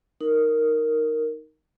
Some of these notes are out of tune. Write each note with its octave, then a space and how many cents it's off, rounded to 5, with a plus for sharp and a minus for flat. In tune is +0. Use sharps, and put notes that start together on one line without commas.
D#4 +10 A#4 -5